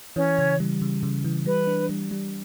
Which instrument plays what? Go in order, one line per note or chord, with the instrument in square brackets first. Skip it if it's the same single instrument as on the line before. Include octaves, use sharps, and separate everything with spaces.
[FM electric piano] E3 [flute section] C#4 C#5
[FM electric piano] C#3
G3
C#3
C#3
E3
[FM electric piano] G3 [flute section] B4
[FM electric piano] D4
G3
G3